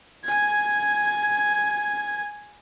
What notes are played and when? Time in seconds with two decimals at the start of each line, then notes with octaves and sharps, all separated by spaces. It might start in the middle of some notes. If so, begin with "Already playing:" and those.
0.25 G#5 G#6